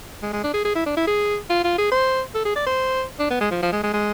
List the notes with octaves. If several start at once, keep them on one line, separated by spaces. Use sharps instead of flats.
G#3
G#3
D4
G#4
G#4
E4
D4
E4
G#4
F4
F4
G#4
C5
A4
G#4
D5
C5
D4
B3
G#3
F3
F3
G#3
G#3
G#3